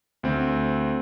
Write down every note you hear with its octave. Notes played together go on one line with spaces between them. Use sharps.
D2 C4